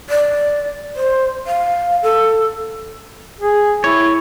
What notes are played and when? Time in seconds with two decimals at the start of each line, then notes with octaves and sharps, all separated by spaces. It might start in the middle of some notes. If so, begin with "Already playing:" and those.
0.10 D5
0.96 C5
1.47 F5
2.03 A4
3.41 G#4
3.84 E4 C#5